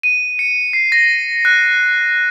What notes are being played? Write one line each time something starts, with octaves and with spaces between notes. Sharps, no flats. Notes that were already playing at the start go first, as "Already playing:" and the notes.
D#7
C#7
C7
A#6
F#6